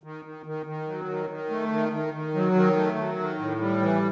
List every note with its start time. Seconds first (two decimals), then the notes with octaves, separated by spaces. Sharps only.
0.04 D#3
0.25 D#3
0.46 D#3
0.66 D#3
0.88 F#3
1.08 D#3
1.30 D#3
1.50 A3
1.72 D#3
1.93 D#3
2.14 D#3
2.34 F#3
2.55 D#3
2.76 A3
2.98 F#3
3.18 D#3
3.39 A2
3.61 G3
3.81 E3